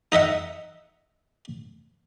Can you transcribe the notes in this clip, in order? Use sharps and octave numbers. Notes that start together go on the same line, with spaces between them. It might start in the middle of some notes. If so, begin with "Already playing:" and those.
D#4 D#5 E5 F#5